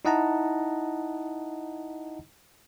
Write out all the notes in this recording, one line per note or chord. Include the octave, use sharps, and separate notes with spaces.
D#4 E4 D#5 F#5 A5 A#5